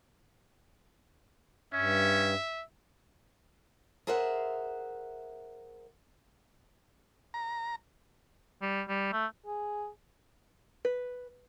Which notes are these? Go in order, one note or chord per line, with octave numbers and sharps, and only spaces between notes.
G2 C#4 E5
G#4 A#4 C5 E5 F#5
A#5
G3
G3
A3
G#4
B4